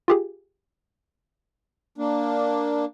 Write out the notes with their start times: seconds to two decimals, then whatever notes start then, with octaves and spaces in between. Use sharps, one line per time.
0.08 F4 G4 G#4
1.98 A#3 D4